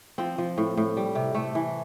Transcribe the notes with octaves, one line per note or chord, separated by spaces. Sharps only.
F3 C4
F3
A2
A2
G3
C3
C3 A3
E3